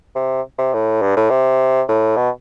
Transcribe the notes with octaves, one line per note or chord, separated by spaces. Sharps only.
C3
C3
A2
G2
A2
C3
A2
B2